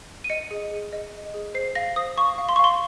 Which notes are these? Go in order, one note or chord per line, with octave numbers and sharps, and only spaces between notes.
D#7
D#5 C#7
G#4
G#4
D#5
D#5
G#4
C5 C7
F5 A#6
C5 D#6
F5 C#6
F5
C6
C#6
F5 C6